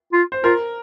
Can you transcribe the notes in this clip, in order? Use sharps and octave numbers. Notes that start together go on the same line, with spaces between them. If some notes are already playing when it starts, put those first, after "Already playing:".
F4
C5
F4 A#4